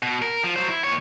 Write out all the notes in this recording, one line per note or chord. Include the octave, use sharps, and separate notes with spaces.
B2
A#4
F3
F#3 C5
E4
D#2 C#5